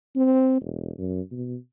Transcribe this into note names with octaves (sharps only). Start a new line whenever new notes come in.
C4
E1
F#2
B2